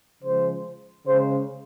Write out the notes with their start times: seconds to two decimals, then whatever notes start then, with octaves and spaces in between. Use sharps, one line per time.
0.23 C#3 F3 G#3 C5
1.05 C#3 G#3 C5